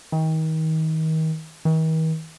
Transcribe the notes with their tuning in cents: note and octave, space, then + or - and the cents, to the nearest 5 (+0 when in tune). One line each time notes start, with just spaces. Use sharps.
D#3 +35
D#3 +45